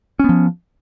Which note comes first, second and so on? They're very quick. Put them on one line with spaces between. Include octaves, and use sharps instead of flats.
C#4 B3 F3